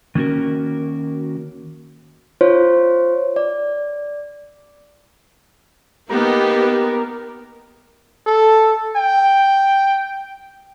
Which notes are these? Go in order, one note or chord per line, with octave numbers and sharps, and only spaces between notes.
D#3 A#3 C#4 F#4 A#4
F4 C5 C#5
D5
A#3 B3 D#4 G4 A#4
A4
G5